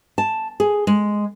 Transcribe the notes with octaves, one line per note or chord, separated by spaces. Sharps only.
A5
G#4
G#3